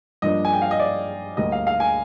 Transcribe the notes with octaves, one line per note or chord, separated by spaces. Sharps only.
G2 F3 A#3 D4 D#5
G#5
G5
F5
D#5
D5
D2 D3 G3 A#3 D#5
F5
F5
G#5